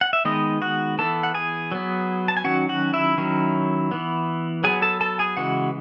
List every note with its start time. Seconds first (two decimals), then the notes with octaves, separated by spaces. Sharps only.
0.01 F#5
0.13 E5
0.25 D#3 G#3 B3 D#4 D#5
0.62 F#4 F#5
0.99 E3 B3 A4 A5
1.23 F#5
1.35 G#4 G#5
1.72 F#3 B3
2.28 A5
2.37 G#5
2.44 D#3 F#3 C#4 F#4 F#5
2.69 F#4 F#5
2.94 E4 E5
3.18 D#3 F#3 C#4
3.91 E3 B3
4.64 F#3 B3 G#4 G#5
4.82 A4 A5
5.01 A4 A5
5.19 G#4 G#5
5.37 C#3 E3 G#3 F#4 F#5